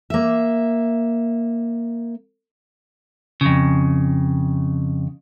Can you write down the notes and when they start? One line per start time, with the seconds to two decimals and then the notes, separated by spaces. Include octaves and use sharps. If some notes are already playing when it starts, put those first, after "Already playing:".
0.10 A#3 E5
3.41 F2 C#3